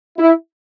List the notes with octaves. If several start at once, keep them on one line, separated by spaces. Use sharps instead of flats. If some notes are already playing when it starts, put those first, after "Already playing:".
E4